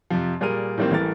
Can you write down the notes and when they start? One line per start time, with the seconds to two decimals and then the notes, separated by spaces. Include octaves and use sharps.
0.10 F2 C3 F3
0.41 A#2 G3 G#4 A#4 D#7
0.78 A2 D#3 G3 A#3 C4
0.91 A1 E3 G3 A3 A#4 A6